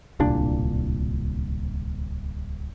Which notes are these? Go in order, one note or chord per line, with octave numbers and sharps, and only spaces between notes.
D1 C2 A#2 D4